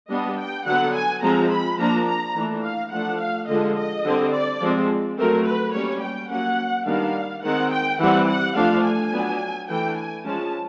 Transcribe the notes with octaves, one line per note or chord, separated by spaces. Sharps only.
G3 B3 D4 D#5
G5
D3 F#3 B3 F#5
G#5
F3 G#3 C4 A#5
B5
F3 A#3 D4 A#5
A#5
E3 A3 D4
F5
F3 A3 D4 F#5
F5
D3 F3 G#3 D#5
D#5
D3 G3 C4
D5
F3 G#3 C4
F#3 A3 C4 A#4
B4
G3 A#3 C#4 C#5
G5
F#3 A#3 C#4 F#5
D#3 G3 B3 D4 F5
D#3 G#3 C4 F#5
G5
E3 G3 C4 F#5
F#5
F3 A3 D4 F5
G#5
F#3 B3 D4
E3 A3 D4 G5
G#5
F3 G#3 C#4 A5